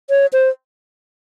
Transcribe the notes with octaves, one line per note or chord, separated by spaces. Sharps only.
C#5
C5